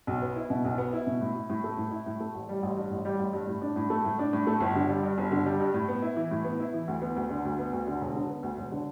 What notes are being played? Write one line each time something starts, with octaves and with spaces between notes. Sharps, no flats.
B1
B3
E4
B2
B1
B3
E4
B2
A2
E4
A2
A3
A2
E4
A2
A3
A1
G3
A1
G2
A1
G3
A1
G2
A2
D4
A2
A3
A2
D4
A2
A3
G1
D3
G3
G2
G1
D3
G3
G2
A2
B3
E4
E3
A2
B3
E4
E3
D2
B3
D2
D3
D2
B3
D2
D3
E1
D3
B3
D2
E1
D3